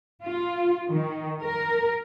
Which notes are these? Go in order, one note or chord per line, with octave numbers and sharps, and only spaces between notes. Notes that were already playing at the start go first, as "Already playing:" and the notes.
F4
D#3
A#4